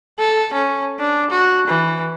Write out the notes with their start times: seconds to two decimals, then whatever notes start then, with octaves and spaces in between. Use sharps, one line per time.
0.19 A4
0.54 C#4
0.99 D4
1.31 F#4
1.68 E3